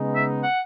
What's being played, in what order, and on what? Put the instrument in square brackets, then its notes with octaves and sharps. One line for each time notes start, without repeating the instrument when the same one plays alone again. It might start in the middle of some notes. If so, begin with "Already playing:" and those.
Already playing: [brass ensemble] C#3 G#3 B3 D#4
[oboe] E5
F#5